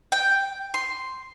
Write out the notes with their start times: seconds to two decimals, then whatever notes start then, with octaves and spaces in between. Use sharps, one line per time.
0.12 G5
0.74 C6